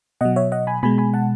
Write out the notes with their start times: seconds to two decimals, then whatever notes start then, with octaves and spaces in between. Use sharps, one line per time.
0.21 B2 F#3 D#5 F#5
0.36 C#5 E5
0.52 D#5 F#5
0.67 G#5 B5
0.83 B2 G#3 G#5 B5
0.98 G#5 B5
1.14 F#5 A5